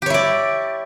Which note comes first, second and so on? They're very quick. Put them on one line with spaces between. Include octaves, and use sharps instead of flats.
G4 C#5 E4 D5